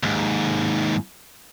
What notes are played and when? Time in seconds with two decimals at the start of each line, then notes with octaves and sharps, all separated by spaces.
0.03 D#2 G#2